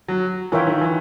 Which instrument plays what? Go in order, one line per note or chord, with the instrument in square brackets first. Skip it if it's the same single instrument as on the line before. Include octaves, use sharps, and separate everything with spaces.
[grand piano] F#3
[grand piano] E3 [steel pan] F4 A#4 C#5 E5 G5
[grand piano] D#3
E3